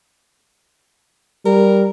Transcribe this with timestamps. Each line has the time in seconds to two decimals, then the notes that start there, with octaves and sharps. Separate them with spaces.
1.46 G3 A#4